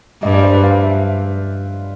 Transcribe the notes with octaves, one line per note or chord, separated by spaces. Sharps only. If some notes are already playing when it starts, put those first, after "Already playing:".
G2 D#5
D5
C5
B4
F5
E5